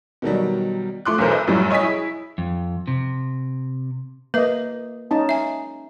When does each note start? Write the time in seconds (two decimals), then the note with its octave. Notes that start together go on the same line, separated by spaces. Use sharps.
0.22 B2 D#3 F#3 G3
1.05 F3 A3 C6 D6 F#6
1.18 B1 E2 B2 A4 A#4 C5
1.31 B4 C5 D#5 E5
1.47 G1 F#2 A2 F3 G3
1.70 C#5 D#5 G#5 D#6 B6
1.83 E4 G#4
2.38 F2
2.88 C3
4.34 A#3 B4 D#5 E5
5.11 C#4 D#4 A5
5.29 E5 G#5